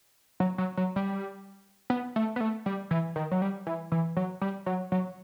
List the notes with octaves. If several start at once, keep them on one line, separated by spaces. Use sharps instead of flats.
F#3
F#3
F#3
G3
B3
A3
B3
A3
G3
E3
D#3
F#3
G3
E3
E3
F#3
G3
F#3
F#3